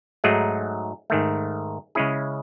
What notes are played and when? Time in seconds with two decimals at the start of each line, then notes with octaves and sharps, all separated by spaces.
0.24 G#2 F#3 A3 D#4 G#4
1.10 G#2 D#3 A3
1.95 C#3 G#3 C#4 E4 G#4